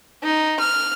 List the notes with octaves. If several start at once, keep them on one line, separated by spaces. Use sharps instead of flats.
D#4
F6